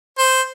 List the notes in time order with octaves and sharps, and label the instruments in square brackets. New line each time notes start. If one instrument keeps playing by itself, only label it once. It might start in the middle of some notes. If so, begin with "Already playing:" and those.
[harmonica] C5